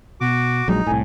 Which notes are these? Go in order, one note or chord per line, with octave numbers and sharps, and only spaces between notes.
B2 F#4 D6
A#1 F#3 G#3 D#4
C2 A2 G#5